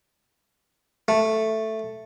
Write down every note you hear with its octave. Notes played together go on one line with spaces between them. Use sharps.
A3